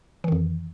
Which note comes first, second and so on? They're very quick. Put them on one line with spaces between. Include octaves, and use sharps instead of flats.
E3 D#3 F2